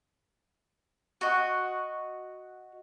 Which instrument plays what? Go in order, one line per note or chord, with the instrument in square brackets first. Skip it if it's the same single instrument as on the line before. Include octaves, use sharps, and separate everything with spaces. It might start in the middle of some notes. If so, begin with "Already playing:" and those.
[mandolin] F#4 D#5